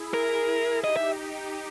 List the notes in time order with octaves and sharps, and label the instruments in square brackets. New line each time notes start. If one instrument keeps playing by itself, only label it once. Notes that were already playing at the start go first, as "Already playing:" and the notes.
Already playing: [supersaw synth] E4 G#4
[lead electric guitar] A#4
[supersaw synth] D#4 G4 [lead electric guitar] D#5
[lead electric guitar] E5